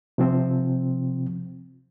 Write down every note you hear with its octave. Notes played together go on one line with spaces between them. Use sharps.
C3 F3 C4